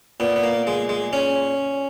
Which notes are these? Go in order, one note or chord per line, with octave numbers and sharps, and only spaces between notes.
A#2 B3
B3
A#3
G#3
G#3
C#4